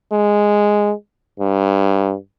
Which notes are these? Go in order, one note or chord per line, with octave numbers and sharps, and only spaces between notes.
G#3
G2